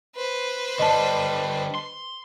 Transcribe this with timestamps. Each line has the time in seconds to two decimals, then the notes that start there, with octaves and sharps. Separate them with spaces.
0.16 B4 C5
0.79 D3 G3 D#5 A5
1.75 C6